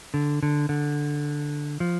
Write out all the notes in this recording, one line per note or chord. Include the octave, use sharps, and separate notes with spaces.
D3
D3
D3
F3